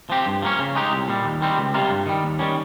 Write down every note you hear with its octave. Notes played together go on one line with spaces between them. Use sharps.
F3 C4 G4
G2
F3 A#3 C#4
C#3
G#3 D#4 G4
C2
A#2 G3
D#2
D#3 G3 C4
C#2
C3 G3 A#3 F4
G2
D#3 G3
D#2
D#3 G3 C#4